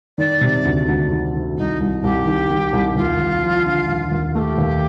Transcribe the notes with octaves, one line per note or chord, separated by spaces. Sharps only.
D#3 D5
C3
D2
D2
D#3
D#3
C2 D#4
C2
C2 G4
D#3
D#3
C2
D#2 F4
D#2
F3
D3
D#2
D#2
A3 G4 A#4
D#2